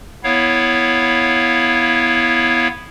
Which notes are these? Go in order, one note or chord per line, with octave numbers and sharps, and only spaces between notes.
B3 E4 C#5 F5